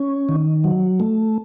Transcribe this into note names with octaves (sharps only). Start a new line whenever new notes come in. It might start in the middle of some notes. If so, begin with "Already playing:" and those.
Already playing: C#4
D#3
F#3
A3